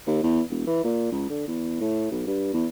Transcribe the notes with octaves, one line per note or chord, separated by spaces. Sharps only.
D#2
E2
E1
E3
A#2
C#2
D3
E2
A2
B1
G2
E2